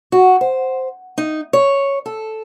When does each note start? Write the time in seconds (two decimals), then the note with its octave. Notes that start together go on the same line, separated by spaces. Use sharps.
0.12 F#4
0.41 C5
1.18 D#4
1.53 C#5
2.06 A4